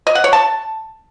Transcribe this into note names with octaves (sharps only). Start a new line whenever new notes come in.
D#5
F#5
C#5
A5